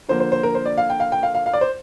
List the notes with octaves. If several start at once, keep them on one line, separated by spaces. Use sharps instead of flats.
D3 F3 A#3 C5
C5
C5
A#4
C5
D5
F5
G5
F5
G5
F5
F5
F5
D5
C5